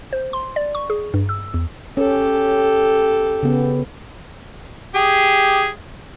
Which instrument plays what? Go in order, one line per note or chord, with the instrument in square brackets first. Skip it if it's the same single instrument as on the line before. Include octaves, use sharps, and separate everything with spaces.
[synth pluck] C5
C6
D5
C#6
G#4
G2
E6
E2
[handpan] C#4 [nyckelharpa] G4 A4
[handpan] C#3 B3
[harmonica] G4 G#4